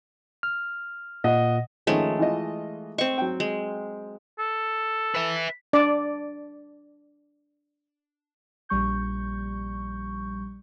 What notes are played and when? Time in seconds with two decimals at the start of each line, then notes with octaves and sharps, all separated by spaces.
0.43 F6
1.24 A#2 D#5 F#5
1.87 D#3 F3 G#3 A3 C#4
2.19 E3 F4 D#5
2.98 C4 D#5 C#6
3.18 F#3 G5
3.40 G#3
4.39 A4
5.15 B4 E5
5.73 D4 D5
8.69 A#1 G3 C#6 G6